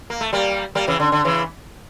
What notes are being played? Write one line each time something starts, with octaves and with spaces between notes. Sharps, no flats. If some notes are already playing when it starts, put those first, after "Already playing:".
A#3
A3
G3 A#3
G3 A#3
C#3 E3
D3
D3
C#3 E3